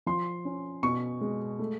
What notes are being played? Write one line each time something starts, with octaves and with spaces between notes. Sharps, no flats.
F3 C6
C#4
B2 C#6
G#3
A3